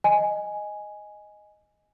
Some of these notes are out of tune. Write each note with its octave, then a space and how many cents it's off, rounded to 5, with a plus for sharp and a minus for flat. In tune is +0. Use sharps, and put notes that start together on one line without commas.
D#5 +0 G#5 +0